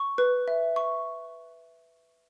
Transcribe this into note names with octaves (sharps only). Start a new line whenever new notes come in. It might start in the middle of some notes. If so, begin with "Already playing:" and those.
Already playing: C#6
B4
E5
C#6